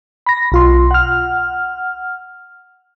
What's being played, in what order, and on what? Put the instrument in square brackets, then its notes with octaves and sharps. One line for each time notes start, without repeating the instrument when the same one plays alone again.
[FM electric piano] B5 A#6
B1 F4 C6
F#5 F6